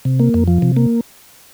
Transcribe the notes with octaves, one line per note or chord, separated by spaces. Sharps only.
C3
A#3
F2
F3
C3
A#3